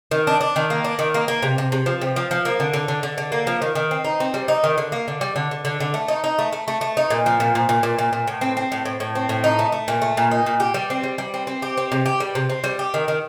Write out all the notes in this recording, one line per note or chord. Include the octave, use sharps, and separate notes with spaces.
D#3
D4
D4
D#3
A#3
D4
D#3
A#3
A#3
C3
C3
C3
F3
C3
F3
F3
A#3
D3
D3
D3
D3
D3
A#3
F3
D#3
D#3
C4
D#4
C4
G3
D#4
D#3
D3
A#3
D3
G3
D3
D3
D3
D3
A3
D#4
D#4
A3
A3
A3
A3
D#4
A#2
F3
A#2
A#2
A#2
A#2
A#2
A#2
A2
C4
C4
A2
A2
A2
C4
A2
D#4
A3
A3
A#2
A3
A#2
D#4
A#2
G4
G3
C4
G3
G3
C4
C4
G4
C4
C3
G4
G3
C3
C4
G3
G4
D#3
D#3